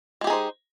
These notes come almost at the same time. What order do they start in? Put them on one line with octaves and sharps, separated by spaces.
G#3 G4 G#4 D#4 C5